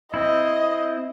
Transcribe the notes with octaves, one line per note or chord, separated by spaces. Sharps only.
C4 E4 D#5